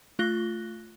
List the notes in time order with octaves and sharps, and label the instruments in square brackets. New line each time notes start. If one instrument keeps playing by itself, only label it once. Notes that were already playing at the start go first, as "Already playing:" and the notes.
[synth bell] A3 F4 F#6 A#6 G7